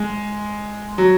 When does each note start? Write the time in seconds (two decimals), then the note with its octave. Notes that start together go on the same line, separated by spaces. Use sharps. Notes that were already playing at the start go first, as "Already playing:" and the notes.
Already playing: G#3
0.98 F#3